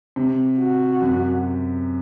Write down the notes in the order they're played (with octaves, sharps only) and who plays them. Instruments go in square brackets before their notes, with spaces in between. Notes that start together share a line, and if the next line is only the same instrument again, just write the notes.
[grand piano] C3
[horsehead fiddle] F#4
[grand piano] F#2